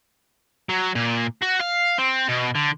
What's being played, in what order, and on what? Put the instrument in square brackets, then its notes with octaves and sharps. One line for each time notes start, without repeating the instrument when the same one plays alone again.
[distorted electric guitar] F#3
A#2
F#4
F5
C4
B2
D3